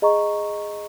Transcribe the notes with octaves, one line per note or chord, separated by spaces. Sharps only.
G#4 D#5 A#5 C#6